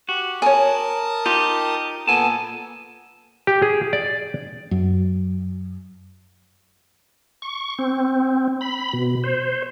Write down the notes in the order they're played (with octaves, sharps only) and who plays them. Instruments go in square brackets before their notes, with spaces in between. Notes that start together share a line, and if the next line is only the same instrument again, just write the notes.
[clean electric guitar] F#4 [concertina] G4
[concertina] A#4 A5 D#6 [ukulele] C#5 G#5
[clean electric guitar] D#4 G4 [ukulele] F4
[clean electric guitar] A#2 G#5 A5 [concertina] B3 A4
[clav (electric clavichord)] G4
G#4
D5
[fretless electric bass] F#2
[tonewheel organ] C#6
C4
B5
B2
C5